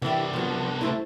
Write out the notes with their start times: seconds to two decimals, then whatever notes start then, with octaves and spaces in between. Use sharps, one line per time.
0.02 C2 E3 D4 E4 G4
0.33 F3 F#3 B3
0.81 A3 E4 B4 C5